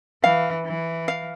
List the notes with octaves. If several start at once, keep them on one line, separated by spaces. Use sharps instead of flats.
E3 F5
E3
F5